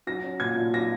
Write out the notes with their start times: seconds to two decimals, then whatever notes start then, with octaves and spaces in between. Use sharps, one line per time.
0.07 F#3 A#6
0.23 C#4
0.40 A#2 G#6
0.56 A#2
0.73 F#3 A#6